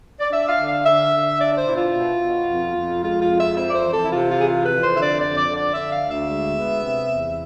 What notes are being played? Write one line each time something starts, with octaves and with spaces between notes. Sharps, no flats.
D5
D4 E5
F5
D3
F5
D3 E5
D3
D4 D5
D5
C5
B2 E4
F4
B2
B2
F2
F2
G#3 F4
F4
F2
E5
C4 E5
D5
C5
E3
A4
E4
C3 F4
F4
E3 G#4
F4
F2 B4
C5
D3 E5
D5
F2 D5
D5
D3
D5
D3 E5
F5
D2
E5
G#3
B3
C3
E2